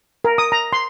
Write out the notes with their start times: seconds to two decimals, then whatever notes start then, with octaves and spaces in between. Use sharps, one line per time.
0.25 A#4
0.38 D#6
0.52 A#5
0.73 C6